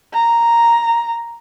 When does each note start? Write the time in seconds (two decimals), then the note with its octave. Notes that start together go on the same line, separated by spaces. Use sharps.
0.13 A#5